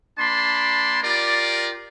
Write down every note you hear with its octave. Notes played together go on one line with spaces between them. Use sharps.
A#3 D4 A5 B5 C6
F4 G4 A#4 D5